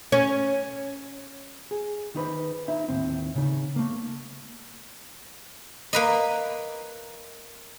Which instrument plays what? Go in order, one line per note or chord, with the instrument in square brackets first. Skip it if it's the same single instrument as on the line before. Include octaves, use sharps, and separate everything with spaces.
[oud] C#4
[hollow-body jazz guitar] G#4
D#3 D#4 B4 C5
D#4 E5
D#2 A2 D3 C4
C#3 D#4
A3 A#3
[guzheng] A#3 B4 D#5